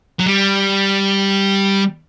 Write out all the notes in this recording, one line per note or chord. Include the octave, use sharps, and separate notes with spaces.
F#3
G3